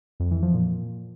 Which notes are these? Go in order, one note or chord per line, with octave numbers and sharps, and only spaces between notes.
F2
E3
F3
A#2